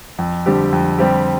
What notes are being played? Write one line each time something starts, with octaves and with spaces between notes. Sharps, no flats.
F2
D3 G3 C4 G4
F2
D3 G3 C4 G4